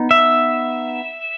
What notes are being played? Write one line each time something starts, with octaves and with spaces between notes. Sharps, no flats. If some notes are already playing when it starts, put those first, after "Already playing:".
Already playing: B3 D#4
E5